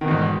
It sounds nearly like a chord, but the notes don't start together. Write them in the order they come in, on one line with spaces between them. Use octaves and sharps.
D#3 B2 E2 G#2